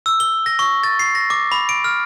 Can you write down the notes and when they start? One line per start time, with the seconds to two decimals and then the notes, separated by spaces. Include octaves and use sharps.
0.06 E6
0.20 G7
0.46 A#6
0.59 C#6
0.83 A6
0.99 C7
1.15 A#6
1.30 D6
1.52 B5
1.69 D7
1.84 F6